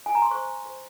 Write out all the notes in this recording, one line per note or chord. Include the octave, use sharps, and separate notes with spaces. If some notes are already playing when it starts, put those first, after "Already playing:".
G#5
A#5
C6
C5 C#6
C5